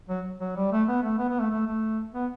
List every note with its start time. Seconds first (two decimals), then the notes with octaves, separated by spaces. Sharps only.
0.09 F#3
0.40 F#3
0.56 G3
0.72 A3
0.88 B3
1.03 A3
1.18 B3
1.29 B3
1.40 A3
1.50 A3
1.66 A3
2.14 B3